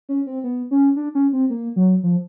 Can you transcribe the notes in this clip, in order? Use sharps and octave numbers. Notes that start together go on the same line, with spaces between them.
C#4
C4
B3
C#4
D4
C#4
C4
A#3
F#3
F3